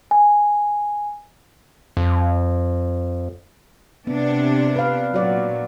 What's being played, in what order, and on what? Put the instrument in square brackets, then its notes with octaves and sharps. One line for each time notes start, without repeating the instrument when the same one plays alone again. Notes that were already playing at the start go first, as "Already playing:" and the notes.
[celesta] G#5
[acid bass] F2
[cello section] C3 D4 [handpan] B3
[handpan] B4 F5
[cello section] A#2 F#3 [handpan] F#4 D5